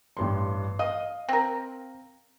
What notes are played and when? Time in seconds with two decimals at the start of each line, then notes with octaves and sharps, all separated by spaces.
0.17 A1 G2 C6
0.79 D#5 F5
1.29 C4 A#4